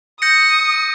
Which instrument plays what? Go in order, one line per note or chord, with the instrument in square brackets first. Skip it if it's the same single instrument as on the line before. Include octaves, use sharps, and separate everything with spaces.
[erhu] D#6 [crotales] G6 A#6 C#7